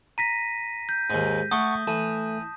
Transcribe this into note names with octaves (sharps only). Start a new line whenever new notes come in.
A#5 A#6 B6 D#7
G6
D#2 G#2
A3 F#5 A5 C#6 D#6
E3 A3 A5